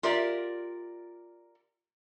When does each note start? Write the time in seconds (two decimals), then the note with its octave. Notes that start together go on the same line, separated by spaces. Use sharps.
0.03 F4 G4 A#4 D5 E5